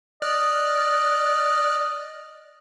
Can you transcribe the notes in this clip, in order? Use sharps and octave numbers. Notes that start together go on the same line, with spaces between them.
D5 D#5 F6 F#6